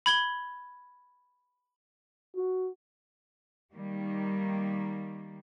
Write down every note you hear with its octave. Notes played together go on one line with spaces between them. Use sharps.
B5 G#6 G7
F#4
D#3 G3 A#3